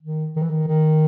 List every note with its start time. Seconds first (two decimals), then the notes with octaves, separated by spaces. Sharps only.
0.03 D#3
0.36 D#3
0.42 E3
0.50 D#3
0.68 D#3